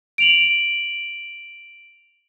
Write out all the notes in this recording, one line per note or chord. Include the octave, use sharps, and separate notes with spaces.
D7 F7 F#7